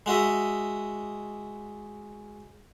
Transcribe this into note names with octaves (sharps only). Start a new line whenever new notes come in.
G#3 F#4 D#5 E5